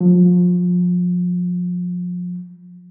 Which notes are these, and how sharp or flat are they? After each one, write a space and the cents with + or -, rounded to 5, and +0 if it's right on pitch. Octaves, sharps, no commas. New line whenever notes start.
F3 +30